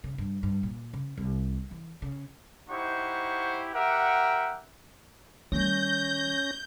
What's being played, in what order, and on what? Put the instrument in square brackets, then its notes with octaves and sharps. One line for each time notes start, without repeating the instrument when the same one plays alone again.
[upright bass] C#3
G2
G2
A#2
C#3
C2
E3
C#3
[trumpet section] D#4 E4 G4 C5 F#5 C#6
G4 A#4 E5 F#5
[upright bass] D#3 G3 [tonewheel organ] C#4 A#6 [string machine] G6